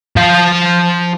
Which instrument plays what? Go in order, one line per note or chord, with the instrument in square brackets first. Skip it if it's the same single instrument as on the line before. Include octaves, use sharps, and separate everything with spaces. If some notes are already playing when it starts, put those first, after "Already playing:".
[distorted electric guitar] F3 F5